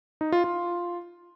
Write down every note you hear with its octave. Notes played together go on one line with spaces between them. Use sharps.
D#4
F4
F4